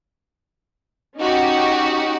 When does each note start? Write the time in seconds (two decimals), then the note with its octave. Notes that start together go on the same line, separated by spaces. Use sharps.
1.19 C#4 D#4 F#4 G4